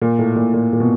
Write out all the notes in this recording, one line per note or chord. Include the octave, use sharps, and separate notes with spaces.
A#2
A2
A#2
A#2
A#2
B2